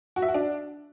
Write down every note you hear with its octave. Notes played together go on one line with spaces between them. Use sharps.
F#4
E5
F#4
D4